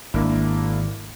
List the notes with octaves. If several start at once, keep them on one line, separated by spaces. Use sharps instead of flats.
G#1 A#3 D4 E4